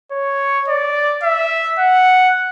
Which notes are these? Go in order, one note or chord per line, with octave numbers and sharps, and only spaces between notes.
C#5
D5
E5
F#5